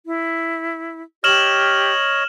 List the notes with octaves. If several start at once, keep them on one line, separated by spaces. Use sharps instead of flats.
E4
G4 C#5 D#5 F6 E7 F#7